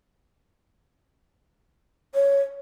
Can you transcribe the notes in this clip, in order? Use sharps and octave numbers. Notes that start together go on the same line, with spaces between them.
C#5